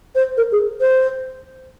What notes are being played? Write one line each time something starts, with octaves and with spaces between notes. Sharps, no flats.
C5
A#4
G#4
C5